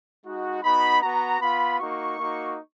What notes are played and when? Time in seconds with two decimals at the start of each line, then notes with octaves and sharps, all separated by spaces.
0.24 G#3 D#4 F#4
0.63 B3 D#4 F#4 B5
1.02 B3 F#4 A#5
1.40 B3 F4 B5
1.79 A#3 D#4 F#4 C#6
2.19 A#3 D#4 F#4